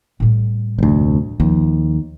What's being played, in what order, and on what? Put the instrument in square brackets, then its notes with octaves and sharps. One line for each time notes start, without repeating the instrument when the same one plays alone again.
[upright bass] A2 G3
[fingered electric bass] F1 D2
[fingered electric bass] D#2 [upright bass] F3